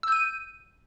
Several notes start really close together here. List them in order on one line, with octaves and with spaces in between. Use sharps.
E6 G6 D#7